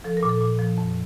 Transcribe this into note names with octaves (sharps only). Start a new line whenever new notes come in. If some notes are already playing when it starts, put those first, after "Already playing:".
F3 A4
A#4
A#2
A4
A#2
F3
F2